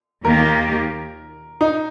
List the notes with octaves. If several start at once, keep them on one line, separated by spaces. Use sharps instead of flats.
D#2 D#3 A#3 G4 A#4
D#4